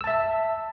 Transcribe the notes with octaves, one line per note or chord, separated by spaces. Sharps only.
E5 A5 E6